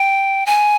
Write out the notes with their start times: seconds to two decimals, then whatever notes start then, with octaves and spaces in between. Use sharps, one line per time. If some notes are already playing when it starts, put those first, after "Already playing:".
Already playing: G5
0.46 G#5